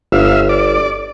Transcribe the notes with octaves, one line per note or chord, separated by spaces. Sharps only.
G1 E5 F5
D5